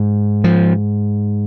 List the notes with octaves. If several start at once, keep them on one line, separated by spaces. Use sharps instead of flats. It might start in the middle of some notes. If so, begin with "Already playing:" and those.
Already playing: G#2
F3